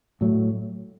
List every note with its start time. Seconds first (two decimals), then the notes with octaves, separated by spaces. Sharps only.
0.21 A2 F#3 A3